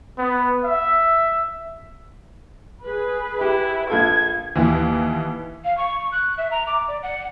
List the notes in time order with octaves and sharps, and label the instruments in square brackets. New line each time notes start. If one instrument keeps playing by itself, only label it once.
[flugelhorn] B3
E5
[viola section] G#4 B4
[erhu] E4 [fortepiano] G4
[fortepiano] A#1 F4 A4 [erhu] G#6
[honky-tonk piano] D#2 E3
[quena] F5
C#6
F#6
E5
A#5
D6
D5
F#5